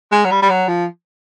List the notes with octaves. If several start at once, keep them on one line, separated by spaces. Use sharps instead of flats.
G#3
F#3
G3
G3
F#3
F3